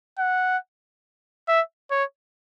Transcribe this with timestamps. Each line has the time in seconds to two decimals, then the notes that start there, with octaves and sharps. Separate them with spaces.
0.19 F#5
1.48 E5
1.91 C#5